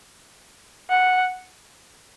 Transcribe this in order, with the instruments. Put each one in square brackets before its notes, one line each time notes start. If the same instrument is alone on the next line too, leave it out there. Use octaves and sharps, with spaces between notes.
[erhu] F#5